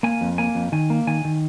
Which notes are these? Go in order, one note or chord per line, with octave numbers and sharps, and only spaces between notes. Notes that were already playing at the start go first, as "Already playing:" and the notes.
A#3 G#5
F2
A#3 G#5
F2
D#3 G#5
A#3
D#3 G#5
D#3